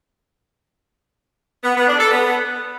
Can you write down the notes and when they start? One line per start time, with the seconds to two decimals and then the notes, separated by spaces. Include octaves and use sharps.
1.64 B3
1.75 B3
1.87 D4
1.99 A4
2.11 B3